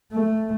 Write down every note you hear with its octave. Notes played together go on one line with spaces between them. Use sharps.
A3